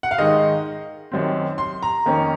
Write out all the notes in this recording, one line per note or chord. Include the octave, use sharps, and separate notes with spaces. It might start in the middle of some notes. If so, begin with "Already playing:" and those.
F#5
F5
G#2 D#3 G#3 D#4 D#5
F#2 D#3 F#3 C4
C6
A#5
F2 D#3 A#3 C#4